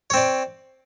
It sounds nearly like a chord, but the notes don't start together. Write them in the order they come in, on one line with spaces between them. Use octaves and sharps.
C#5 C4 D5